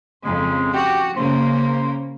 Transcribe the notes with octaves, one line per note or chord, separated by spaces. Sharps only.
F2 C#3 G#3
F#4 G4
C#3 A#3 C5